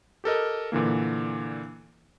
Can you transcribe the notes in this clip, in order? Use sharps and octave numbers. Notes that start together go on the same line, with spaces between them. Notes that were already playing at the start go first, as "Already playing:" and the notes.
G4 A4 A#4 D#5
A#2 D3 E3 A#3